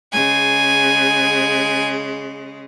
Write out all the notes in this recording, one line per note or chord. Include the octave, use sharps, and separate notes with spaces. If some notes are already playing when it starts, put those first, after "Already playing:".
C#3 G#3 G#5